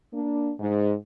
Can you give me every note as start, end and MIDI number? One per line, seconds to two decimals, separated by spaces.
0.13 0.52 58
0.13 0.52 62
0.59 0.93 44